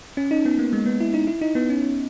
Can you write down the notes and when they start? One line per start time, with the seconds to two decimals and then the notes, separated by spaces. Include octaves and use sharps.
0.17 C#4
0.31 D#4
0.45 B3
0.58 A#3
0.73 G#3
0.86 B3
1.00 E4
1.14 D#4
1.27 E4
1.41 D#4
1.55 B3
1.69 C#4